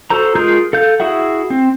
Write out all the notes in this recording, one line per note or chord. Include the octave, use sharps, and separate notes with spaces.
F#4 A4 C5 A#5
G#3 F4 G#4 A#4 G6
A4 F5 G6
E4 F#4 G#4 E5 F#5
C4